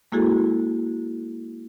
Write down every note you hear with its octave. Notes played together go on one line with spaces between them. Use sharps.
G#3 A#3 E4 F#4 G#4 A4